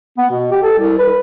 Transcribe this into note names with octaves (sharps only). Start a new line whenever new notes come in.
B3
B2
G4
A4
C2
B4